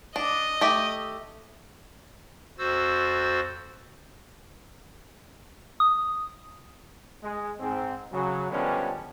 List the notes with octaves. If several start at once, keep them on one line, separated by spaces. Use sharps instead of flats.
D4 D#5
A3 G4
F2 F#4 C5 E6 A6
D#6
G#3
G#2 C4
C#3 F#3
D3 F3 G3 G#3 B3 C#4